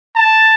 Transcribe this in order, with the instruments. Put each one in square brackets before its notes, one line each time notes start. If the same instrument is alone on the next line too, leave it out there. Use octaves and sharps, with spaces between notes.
[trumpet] A5